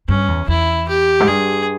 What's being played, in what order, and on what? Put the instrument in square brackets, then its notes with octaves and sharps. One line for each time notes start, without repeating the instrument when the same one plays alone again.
[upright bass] G2 [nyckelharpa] C#4
[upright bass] E2
[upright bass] E2 [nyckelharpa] E4
[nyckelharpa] G4
[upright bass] G#2
[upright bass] G2 [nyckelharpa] G#4